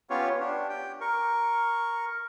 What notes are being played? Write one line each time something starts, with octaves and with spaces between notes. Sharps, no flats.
B3 C#4 F4 G4 C#5
D4 G4
G4 G5
A#4 C#6